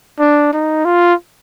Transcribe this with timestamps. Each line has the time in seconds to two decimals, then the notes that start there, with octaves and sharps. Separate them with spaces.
0.19 D4
0.53 D#4
0.85 F4